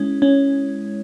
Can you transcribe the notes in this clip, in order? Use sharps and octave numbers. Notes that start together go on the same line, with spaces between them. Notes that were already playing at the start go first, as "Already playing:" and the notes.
Already playing: G#3 C#4 E4
C#4